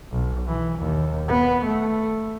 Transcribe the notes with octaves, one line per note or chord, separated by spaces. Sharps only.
B1
E3
D#2
B3
A3